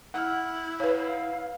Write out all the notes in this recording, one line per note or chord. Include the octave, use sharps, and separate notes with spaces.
E4 F#5 F6
B4 C#5 F5